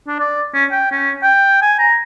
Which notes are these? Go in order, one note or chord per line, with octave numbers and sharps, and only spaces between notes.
D4
D5
C#4
G5
C#4
G5
G#5
A#5